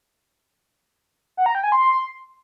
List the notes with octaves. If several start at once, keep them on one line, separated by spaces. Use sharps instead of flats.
F#5
A#5
G5
G#5
C6